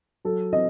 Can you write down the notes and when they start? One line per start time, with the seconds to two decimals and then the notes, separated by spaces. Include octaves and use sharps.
0.25 F#3 A4
0.53 C4 D#5